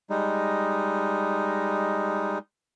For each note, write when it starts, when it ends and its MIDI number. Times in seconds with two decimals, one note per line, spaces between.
0.10 2.38 55
0.10 2.38 56
0.10 2.38 63